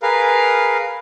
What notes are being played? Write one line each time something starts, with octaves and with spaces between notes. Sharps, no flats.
G#4 A#4 B4 F5